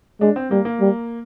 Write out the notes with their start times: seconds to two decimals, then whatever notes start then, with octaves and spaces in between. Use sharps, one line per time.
0.21 G#3 D4
0.36 C4
0.51 G3 A#3
0.65 A#3
0.81 G3